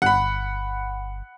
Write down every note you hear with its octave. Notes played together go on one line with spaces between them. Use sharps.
G1 F#5 B5